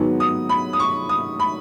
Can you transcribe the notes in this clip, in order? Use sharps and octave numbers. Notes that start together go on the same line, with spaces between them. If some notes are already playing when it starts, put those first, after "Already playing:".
Already playing: G#2 D#3 F#3 B3
D#6
B5
D#6
C#6
D#6
B5